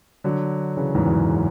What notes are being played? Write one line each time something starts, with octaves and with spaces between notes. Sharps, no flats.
D3 F#3
C#3 E3
E2 G#2
E2
F#2